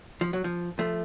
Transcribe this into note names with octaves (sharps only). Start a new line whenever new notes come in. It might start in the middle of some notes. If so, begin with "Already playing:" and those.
F3
F#3
F3
F3 A3